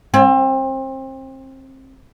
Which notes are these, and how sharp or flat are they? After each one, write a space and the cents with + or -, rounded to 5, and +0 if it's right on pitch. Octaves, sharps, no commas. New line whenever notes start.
C4 +30